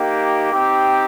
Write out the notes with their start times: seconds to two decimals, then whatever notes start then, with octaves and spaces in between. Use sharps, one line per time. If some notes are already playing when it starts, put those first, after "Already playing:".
Already playing: A#3 D#4 G4
0.52 C4 D#4 G4